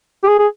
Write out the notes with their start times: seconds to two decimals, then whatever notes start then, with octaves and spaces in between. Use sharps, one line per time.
0.24 G4
0.28 G#4
0.39 G#4